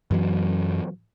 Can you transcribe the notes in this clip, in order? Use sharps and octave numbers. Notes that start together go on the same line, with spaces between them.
F#2 E3 F#3